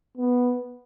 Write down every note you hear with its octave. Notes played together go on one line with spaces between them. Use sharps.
B3